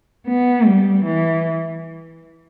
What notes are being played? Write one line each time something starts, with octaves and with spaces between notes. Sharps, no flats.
B3
G3
E3